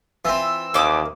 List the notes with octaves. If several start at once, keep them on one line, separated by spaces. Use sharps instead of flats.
E3 C4 F4 E6
D#2 A#3 D6 D#6